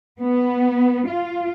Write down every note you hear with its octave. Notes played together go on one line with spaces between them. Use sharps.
B3
F4